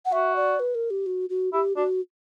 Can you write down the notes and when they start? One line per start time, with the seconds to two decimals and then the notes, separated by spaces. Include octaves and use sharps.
0.05 F#5
0.12 F#4 E5
0.36 D5
0.60 B4
0.75 A#4
0.90 G4
1.06 F#4
1.30 F#4
1.53 E4 G4
1.76 D4 F#4